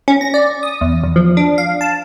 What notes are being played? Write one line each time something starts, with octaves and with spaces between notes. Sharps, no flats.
C#4
A#6
D5
D#6
E2
E2
F3
D4
F5
A5